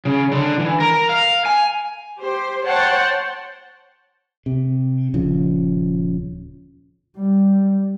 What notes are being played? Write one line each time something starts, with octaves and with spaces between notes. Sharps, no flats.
C#3
D3
E3
A#4
F5
G#5
G4 C5
C5 C#5 F#5 G5 A5
C3
D#1 C#3 F3
G3